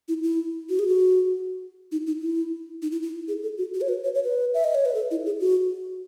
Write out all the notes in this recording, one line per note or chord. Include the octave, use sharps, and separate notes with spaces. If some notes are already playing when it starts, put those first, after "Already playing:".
E4
E4
F#4
G#4
F#4
D#4
D#4
E4
D#4
E4
E4
G#4
A4
F#4
F#4
C#5
B4
C#5
C#5
B4
E5
D#5
C#5
B4
A4
E4
G#4
F#4